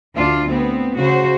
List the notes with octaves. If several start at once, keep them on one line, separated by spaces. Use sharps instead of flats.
D2 D4 F4
B3 C4
C#3 F#4 C5